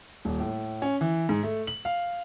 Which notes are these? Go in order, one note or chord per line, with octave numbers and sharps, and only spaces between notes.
D#1
A2
C#4
E3
G#2
A3
F#7
F5